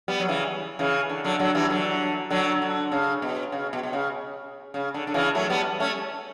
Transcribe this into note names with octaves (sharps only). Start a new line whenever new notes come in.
G3 B3
F#3
C#3 E3
C#3 E3
D3
D3 F#3
D3 F#3
E3 G3
D3 F#3
D3 F#3
D3
C#3
B2
C#3
B2
B2
C#3
C#3
D3
D3
C#3 E3
F#3 A3
G3 B3
A3 C#4